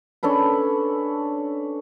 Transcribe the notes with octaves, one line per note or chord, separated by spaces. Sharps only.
C#4 D4 A4 B4